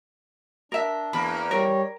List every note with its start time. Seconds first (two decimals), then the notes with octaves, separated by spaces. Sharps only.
0.72 D4 A#4 E5
1.13 E2 A#3 B5
1.51 G3 A#4 C#5